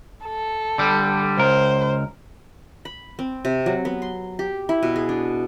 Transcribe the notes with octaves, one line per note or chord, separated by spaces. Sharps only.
A4
D3 G3
C#2 A#4 C5
B5
C4
C3
F#3
B3
C6
G4
E4
B2
G#4
D4